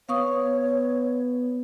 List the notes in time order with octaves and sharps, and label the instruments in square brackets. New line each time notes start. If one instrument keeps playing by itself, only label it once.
[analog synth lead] B3 [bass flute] C#5 [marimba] F5 C#6 D#6